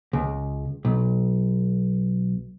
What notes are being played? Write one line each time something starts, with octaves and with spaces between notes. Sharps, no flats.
C#2
B1